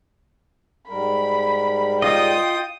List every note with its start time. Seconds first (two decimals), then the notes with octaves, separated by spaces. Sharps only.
0.89 G#2 G3 A#4 B5
2.02 F4 D#5 G5 D#6